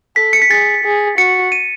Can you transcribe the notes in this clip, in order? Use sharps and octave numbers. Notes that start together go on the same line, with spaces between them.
A4 B6
C#7
B6
G#4 A6
G#4
F#4 C#7
D#7